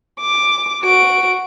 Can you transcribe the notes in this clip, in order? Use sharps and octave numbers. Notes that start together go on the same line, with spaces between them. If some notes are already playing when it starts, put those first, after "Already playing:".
D6
F#4 D7